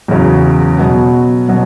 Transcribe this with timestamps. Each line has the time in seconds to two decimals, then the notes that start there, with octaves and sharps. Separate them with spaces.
0.08 E2 C#3 F#3
0.78 B2 F#3 B3
1.48 B2 F#3 B3